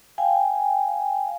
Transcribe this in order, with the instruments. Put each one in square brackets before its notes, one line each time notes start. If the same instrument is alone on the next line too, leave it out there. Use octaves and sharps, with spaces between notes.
[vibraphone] F5 G5 G#5